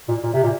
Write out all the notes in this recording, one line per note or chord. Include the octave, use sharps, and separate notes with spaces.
A#2
A#2
C3
A#2